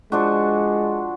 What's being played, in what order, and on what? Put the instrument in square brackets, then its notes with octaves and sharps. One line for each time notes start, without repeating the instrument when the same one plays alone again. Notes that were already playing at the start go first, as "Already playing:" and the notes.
[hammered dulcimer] F3 D4 F#4 [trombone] G#3